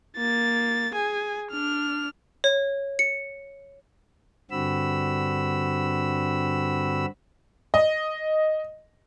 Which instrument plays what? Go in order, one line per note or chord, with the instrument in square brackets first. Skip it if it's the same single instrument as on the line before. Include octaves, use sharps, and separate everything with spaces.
[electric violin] A#3 A6
G#4 G#5
D4 F6
[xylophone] C#5
C#7
[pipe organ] G2 D3 C4 F#4 B5 E6
[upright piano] D#5